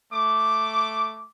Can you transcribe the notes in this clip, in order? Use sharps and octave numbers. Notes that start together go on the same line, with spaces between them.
A3 D6